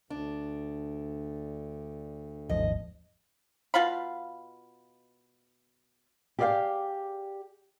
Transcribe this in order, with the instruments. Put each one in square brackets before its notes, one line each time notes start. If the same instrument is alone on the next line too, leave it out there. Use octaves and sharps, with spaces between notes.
[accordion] D2 [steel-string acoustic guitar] D4
[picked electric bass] D#1 G#1 F3 [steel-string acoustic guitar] D#5
[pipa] B2 F4 F5 B5
[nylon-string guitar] G4 G#4 D5 D#5 F5 G5